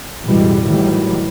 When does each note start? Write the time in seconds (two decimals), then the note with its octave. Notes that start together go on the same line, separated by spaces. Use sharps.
0.23 A1 F2 B2 E3 G3 G#3
0.65 A2 D#3 E3 F#3 G3